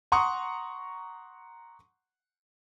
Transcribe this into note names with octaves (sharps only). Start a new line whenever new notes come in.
F#5 A#5 C6 C#6 D#6